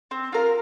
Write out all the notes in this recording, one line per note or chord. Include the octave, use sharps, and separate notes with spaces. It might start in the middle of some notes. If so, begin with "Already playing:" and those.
C4
F4 A#4 F5